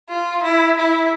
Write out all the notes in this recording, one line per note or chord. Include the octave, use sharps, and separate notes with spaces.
F4
E4
E4